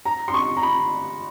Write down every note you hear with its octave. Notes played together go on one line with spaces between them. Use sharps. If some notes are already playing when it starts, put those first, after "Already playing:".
A#5
C6
C#6
A#5
B5